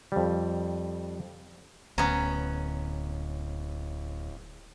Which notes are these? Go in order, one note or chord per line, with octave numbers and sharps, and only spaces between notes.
F2 G3
D1 D2 B3 C#4 A#5